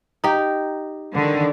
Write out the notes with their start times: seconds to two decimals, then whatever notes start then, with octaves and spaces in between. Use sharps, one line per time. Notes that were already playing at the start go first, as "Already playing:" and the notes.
0.24 D#4 G4
1.15 D3 D#3